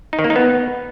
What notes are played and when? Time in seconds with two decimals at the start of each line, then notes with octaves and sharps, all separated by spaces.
0.13 D#4
0.19 D#3
0.24 A#3
0.30 D#4
0.36 B3